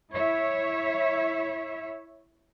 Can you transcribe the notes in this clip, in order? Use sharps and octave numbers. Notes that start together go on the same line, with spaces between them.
E4 C#5 E5